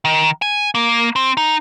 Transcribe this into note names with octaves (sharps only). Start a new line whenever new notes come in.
D#3
G#5
A#3
C4
D#4